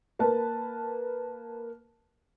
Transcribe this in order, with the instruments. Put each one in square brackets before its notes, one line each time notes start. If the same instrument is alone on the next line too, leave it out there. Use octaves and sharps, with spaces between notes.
[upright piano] A#3 A#4 B4 A5